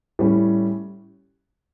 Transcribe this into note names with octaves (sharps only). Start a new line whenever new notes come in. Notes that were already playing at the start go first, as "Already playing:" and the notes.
A2 G3 C#4